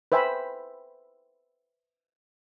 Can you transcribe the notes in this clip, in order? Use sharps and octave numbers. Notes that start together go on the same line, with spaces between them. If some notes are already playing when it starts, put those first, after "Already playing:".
B4 C5 E5 G5 G#5 B5